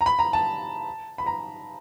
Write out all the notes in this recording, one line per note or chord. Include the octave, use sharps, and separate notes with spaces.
A#5
B5
A#5
A5
B5
A#5